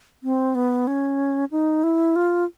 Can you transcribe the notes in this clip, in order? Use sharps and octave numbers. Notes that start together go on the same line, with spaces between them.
C4
B3
C#4
D#4
E4
F4